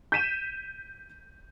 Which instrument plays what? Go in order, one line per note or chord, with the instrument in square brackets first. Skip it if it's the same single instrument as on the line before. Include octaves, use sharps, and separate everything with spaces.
[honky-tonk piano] G6 B6 D#7 E7